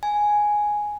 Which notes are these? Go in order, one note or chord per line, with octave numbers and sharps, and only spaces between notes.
G#5